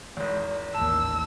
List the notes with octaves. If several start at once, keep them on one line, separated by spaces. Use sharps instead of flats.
G#1 E2
A1 D#2 A5 E6